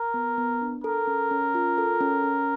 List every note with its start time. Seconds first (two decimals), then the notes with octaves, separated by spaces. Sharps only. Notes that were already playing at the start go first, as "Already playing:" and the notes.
Already playing: A#4
0.14 B3
0.38 B3
0.62 D4
0.84 A4 A#4
1.07 C#4
1.31 C#4
1.55 F4
1.78 A4
2.01 C#4
2.24 C#4